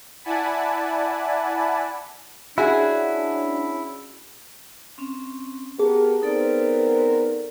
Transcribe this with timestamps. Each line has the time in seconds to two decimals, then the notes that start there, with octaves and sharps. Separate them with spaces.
0.24 E4 D5 F#5 G#5 A5 B5
2.58 C#4 D4 E4 F#4 G#4
4.98 C4 C#4
5.79 B3 G4 G#4 A#4 A5
6.22 B3 C4 D#4 A4 A#4 D5